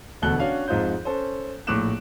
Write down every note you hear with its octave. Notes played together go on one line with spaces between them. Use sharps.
E1 D2 B2 A4 F#6 G7
C#4 D4 F#4 C#5 F5
F2 G#2 D#4 F4 C5 G6
C#4 A4 C5
A#1 A2 D6 F#6 E7